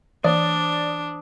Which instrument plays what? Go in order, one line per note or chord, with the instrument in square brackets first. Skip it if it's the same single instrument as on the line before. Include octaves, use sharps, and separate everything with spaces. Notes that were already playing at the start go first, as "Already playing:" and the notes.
[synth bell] E3 C5 D#6 [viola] D4 [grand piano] D5